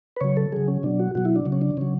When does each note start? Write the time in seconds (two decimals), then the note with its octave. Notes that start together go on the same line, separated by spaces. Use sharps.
0.17 B4
0.21 C#3 F#3 C#5
0.37 A4
0.52 C#3 F#3 G#4
0.68 C#4
0.83 B2 F#3 D4
0.99 F#4
1.15 B2 F#3 F#4
1.25 E4
1.36 D4
1.46 C#3 F#3
1.52 C#4
1.61 D4
1.77 C#3 F#3 C#4